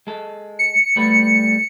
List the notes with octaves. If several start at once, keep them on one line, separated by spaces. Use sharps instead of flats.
G#3 A4
C#7
G3 A3 B4